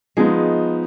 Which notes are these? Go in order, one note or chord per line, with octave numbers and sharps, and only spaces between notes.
F3 G#3 B3 D#4